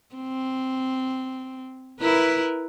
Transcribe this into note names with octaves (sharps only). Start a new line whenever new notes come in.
C4
E4 A#4 B4